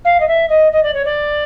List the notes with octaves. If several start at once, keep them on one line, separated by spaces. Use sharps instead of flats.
F5
D#5
E5
D#5
D#5
D5
C#5
D5